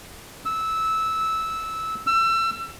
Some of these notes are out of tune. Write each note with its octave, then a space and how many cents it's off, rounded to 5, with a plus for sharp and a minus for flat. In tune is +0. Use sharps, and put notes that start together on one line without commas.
E6 -15
E6 +30